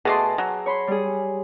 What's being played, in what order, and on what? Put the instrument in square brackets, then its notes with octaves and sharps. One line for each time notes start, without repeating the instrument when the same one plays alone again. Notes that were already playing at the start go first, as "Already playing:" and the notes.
[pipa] B2 A3 C6 [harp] G#4 A5 D6
[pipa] F#3
[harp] C#5 B5 C6
G3 G#4